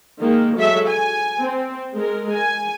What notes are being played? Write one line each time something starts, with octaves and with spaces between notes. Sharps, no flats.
D#3 G#3 A#3
F#3 G#3 A4 E5
G#5
C4
G#3 A#4
G#5